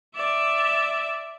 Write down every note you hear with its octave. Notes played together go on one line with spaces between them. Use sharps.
D5 E5 E7